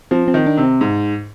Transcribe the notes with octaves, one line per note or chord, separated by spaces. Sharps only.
F3 C4
C4
D#3
D4
C3
C4
G#2